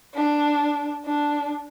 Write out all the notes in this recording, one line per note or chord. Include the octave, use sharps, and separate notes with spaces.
D4
D4